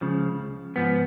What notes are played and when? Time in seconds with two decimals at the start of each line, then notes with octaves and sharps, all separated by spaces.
0.01 C#2 C#3 F3
0.76 G#2 F3 B3